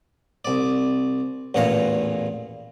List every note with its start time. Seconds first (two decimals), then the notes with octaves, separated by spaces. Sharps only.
0.45 C2 D5
1.54 A1 E2 A#2 C#5 F5 A#5